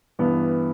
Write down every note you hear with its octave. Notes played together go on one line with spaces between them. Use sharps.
G2 E3 B3